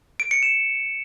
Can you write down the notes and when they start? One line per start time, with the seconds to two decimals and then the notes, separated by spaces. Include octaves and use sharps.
0.20 D7
0.31 C#7
0.43 E7